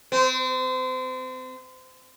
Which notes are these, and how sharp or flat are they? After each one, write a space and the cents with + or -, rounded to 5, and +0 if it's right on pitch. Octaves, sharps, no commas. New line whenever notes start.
C4 -30